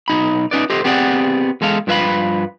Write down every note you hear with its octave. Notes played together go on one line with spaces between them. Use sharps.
B1 D#4 B5
C#4 D#4 B4 D5
G4 A4 C5 D#5
B3 C4 G4 G#4 D5 F#5
E2 G#3 A4 F5
G2 F3 B4 E5 F5 B5